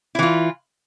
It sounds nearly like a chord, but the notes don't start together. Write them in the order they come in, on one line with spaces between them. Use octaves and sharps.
E4 E3 F4